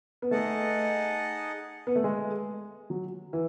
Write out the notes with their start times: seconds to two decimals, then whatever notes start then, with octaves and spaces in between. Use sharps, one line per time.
0.22 B3
0.31 A3 D#4 G#4 D#5 F#5 A5
1.87 B3
1.96 A3
2.04 G#3
2.90 F#3
3.33 E3